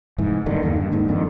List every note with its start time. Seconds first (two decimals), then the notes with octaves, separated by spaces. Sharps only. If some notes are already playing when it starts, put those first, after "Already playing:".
0.18 F1 G#2 E3
0.46 F#1 G2 D3 D#3
0.63 E2 G2 D#3 A#3
0.76 G2
0.92 D1 D#2 G#2
1.08 G1 F2 D3 D#3